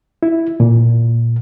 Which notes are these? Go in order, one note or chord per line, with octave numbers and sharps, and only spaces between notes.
E4
A#2